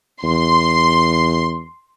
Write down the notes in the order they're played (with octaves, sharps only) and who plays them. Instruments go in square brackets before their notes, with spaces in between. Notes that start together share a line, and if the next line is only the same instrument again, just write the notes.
[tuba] E2 [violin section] C6